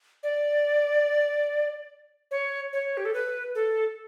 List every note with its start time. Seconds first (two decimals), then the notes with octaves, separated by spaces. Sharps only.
0.23 D5
2.31 C#5
2.73 C#5
2.97 G4
3.05 A4
3.14 B4
3.55 A4